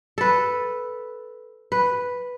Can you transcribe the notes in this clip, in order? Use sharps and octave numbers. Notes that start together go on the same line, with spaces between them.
A4 B4
B4